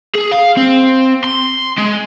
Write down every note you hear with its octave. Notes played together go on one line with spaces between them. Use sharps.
G#4
F5
C4
C6
G#3